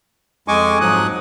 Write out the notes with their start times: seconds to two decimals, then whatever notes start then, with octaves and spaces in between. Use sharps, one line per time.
0.48 F2 G#3 D#5 G#5 C#6 D6
0.81 G#2 F3 F#3 D#6 F#6